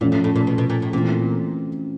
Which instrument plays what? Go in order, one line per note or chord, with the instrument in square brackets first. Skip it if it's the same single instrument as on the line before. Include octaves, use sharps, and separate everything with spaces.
[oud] A#2 [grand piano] F3 A3 C#4 F4
[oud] A2
A2
A#2
B2
B2
A#2
A2
[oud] A#2 [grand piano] E3 A3 C4 F4